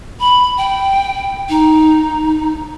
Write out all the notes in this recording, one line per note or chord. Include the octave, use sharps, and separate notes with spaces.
B5
G5
D#4